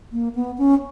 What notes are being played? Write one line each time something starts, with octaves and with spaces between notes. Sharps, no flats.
A#3
B3
C#4